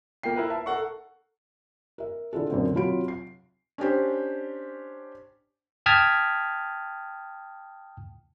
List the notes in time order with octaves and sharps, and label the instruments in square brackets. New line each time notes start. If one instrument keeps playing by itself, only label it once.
[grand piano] A#3 F4 G5 C7
E4 A#4 B4
E5 A5
A4 A#4 F#5 C#6
[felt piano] A#4 E5
D3 E4 F4 G#4 A4
F#2 A#2 D3 C4
C3 F#3 F4 B5 D7
C7
C#4 D4 G4 C5
[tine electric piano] G5 A5 D#6 F6 G#6 B6